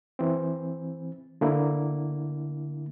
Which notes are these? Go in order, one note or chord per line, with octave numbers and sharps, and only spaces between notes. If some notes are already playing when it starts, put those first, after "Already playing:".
E3 C4
D3 A#3 E4